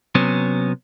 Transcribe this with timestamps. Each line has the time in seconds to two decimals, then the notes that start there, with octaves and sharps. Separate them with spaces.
0.15 C3 F#3 B3 C#4